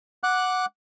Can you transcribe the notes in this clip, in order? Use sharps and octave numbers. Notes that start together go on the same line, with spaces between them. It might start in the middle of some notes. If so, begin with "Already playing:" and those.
F#5 D6 F#6